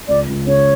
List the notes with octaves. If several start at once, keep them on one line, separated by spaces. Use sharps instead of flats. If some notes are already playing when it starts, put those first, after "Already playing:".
C#2 D5
C#2
C#3 C#5